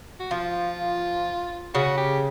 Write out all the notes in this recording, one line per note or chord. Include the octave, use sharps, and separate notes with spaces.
F#4
F3 F4
C#3 F#4
G4